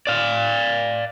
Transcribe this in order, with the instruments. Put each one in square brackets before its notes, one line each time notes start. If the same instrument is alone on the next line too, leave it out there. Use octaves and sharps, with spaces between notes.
[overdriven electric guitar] D5 F5